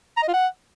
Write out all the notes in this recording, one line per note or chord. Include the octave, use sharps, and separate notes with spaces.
A#5
D#5
F4
F#5